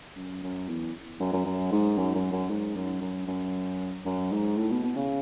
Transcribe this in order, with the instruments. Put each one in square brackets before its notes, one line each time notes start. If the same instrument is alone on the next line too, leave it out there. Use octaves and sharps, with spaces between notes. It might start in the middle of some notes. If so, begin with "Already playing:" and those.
[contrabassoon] F#2
F#2
E2
F#2
F#2
F#2
G#2
F#2
F#2
F#2
G#2
F#2
F#2
F#2
F#2
G#2
A2
B2
B2
C#3